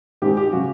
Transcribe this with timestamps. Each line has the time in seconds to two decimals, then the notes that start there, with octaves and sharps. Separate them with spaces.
0.22 G#2 D#3 G#3 G4
0.37 G4
0.52 C#3 F#3 F#4